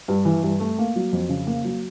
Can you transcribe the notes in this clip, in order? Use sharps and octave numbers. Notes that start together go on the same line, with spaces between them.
G2
E3
G2
A3
A#3
F#3
F2
C#3
A#3
F#3